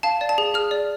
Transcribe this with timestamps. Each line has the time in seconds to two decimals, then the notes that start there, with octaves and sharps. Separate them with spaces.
0.03 F5 A5
0.21 D5
0.29 A5
0.38 G#4
0.54 G#4 F6
0.71 D5